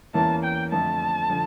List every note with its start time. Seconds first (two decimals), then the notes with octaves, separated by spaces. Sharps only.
0.13 E2 E3 A#3 C#4 E4 A5
0.43 G5
0.71 F2 D3 F3 A3 A5
1.30 D3 F3